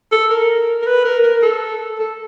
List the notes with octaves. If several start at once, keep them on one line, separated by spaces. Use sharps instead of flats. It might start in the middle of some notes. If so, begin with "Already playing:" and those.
A4
A#4
A#4
B4
A#4
A#4
A4
A4